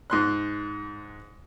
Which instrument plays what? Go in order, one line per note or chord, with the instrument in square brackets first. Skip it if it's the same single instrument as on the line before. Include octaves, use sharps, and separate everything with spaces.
[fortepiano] G#2 C6 F#6